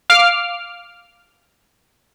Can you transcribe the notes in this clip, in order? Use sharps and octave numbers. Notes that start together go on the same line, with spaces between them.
F5 D6 F6